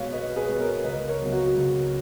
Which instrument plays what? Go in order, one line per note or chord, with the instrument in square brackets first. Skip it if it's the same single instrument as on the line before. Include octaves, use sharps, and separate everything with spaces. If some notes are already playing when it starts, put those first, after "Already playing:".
Already playing: [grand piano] B1 B2 G#3 B3 B4 C#5 F5
B1 B4 D#5
G#4 B4
B2 G#3 B3
A#4 C#5
C#2 B4 D#5
A#4 C#5
C#3 F#3 B3
F#4
C#2